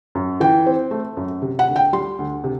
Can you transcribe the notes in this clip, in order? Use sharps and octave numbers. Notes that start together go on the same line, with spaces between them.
F#2
E3 G5
C4
A3
F#2
C3
F#5
D2
G5
G3 C6
D2
C3